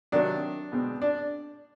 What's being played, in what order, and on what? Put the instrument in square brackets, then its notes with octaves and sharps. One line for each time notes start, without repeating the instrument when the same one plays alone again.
[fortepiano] C3 D#3 F#3 D4
B2 G#3 C4
D4